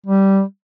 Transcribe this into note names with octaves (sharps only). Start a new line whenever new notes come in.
G3